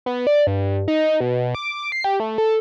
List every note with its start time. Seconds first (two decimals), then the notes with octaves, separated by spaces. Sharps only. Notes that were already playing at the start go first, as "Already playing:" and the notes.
0.06 B3
0.27 D5
0.47 G2
0.88 D#4
1.20 B2
1.55 D6
1.92 C7
2.04 G4
2.20 A3
2.38 A4